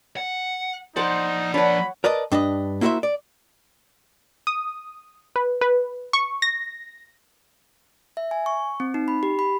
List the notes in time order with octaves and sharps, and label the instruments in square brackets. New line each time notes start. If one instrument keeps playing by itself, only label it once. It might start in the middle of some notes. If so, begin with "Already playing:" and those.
[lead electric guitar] F#5
[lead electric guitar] F3 D5 [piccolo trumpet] D#4 [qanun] C5 F#5 A5
[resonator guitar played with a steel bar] D4 B4 [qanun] C#5 F#5 [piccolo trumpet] B5
[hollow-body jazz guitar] A#4 B4 D5 D#5 A5
G2 D4 B4 D#5
A#3 E4 F#4 A#4 C5 E5
D5
[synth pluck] D#6
B4
B4
C#6
A#6
[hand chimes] E5
G#5
C#6
C4
D#4
B5
G4
B5